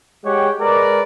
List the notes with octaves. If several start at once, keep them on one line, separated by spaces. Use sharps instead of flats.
G#3 G4 C#5 F#5 G5
G#3 A#4 B4 D5